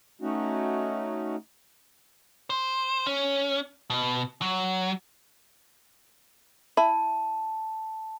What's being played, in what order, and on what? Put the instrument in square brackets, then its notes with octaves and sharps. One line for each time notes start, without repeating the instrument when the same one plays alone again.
[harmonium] A3 C#4 D#4 F#4
[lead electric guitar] C5
C#4
B2
F#3
[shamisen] E4 [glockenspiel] A5